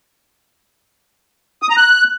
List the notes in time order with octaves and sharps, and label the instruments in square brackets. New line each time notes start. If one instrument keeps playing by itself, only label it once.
[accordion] D#6
A#5
F#6